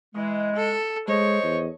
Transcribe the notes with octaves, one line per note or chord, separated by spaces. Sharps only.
E3 G#3
A4
G#3 C5 C#5 D#5
E2